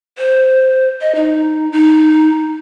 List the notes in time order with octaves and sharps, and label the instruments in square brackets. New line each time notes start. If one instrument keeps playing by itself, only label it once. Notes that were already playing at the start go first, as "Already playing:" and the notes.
[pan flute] C5
D#5
D#4
D#4